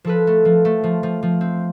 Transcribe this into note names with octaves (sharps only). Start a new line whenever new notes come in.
F3 A4 B4
A3
F3
A3
F3
F3
F3
C4